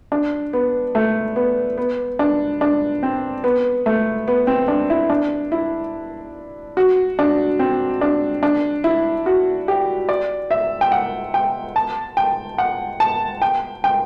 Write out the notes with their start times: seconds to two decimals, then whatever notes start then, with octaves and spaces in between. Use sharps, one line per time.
0.12 D4
0.53 B3
0.95 A3
1.36 B3
1.78 B3
2.19 D4
2.61 D4
3.03 C4
3.44 B3
3.86 A3
4.28 B3
4.47 C4
4.68 D4
4.90 E4
5.10 D4
5.52 E4
6.77 F#4
7.19 D4
7.59 C4
8.01 D4
8.43 D4
8.84 E4
9.26 F#4
9.68 G4
10.09 D5
10.51 E5
10.81 G5
10.92 F#5
11.34 G5
11.76 A5
12.17 G5
12.58 F#5
13.00 A5
13.42 G5
13.84 G5